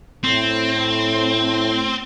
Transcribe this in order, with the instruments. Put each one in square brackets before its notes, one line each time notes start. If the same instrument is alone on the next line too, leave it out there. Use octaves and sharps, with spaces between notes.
[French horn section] A2 [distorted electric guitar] C4